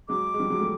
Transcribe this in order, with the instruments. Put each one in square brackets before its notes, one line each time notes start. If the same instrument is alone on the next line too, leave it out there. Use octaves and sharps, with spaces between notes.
[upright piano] F#3 G#3 [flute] D6
[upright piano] G#3
F3 G3
F#3 G#3
G3 A3